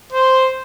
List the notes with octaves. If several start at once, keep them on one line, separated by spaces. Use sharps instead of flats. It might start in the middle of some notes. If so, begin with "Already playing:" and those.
C5